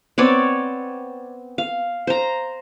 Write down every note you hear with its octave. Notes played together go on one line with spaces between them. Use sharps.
B3 C4 C#5 D5
F5
C5 A#5